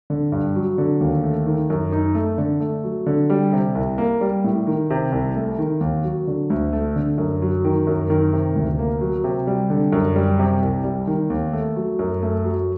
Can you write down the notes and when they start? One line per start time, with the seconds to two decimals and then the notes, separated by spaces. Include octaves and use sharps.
0.10 D3
0.32 G2
0.56 F#3
0.78 D3
1.00 D#2
1.24 A3
1.46 D#3
1.70 F#2
1.92 D#4
2.15 A3
2.38 D3
2.60 A3
2.84 F#3
3.06 D3
3.30 G3
3.53 C3
3.75 C2
3.98 A#3
4.21 G3
4.44 A2
4.67 D#3
4.90 C3
5.12 C2
5.35 A3
5.59 D#3
5.81 D#2
6.04 F#3
6.27 D3
6.50 D2
6.73 A3
6.96 D3
7.18 F#2
7.42 F#3
7.65 D#3
7.87 F#2
8.10 D#3
8.33 C3
8.56 D2
8.79 A#3
9.01 F#3
9.24 C3
9.47 G3
9.70 D3
9.93 F#2
10.16 G3
10.39 C3
10.62 C2
10.84 G3
11.07 D#3
11.30 D#2
11.53 A3
11.76 F#3
11.99 F#2
12.22 A3
12.44 F#3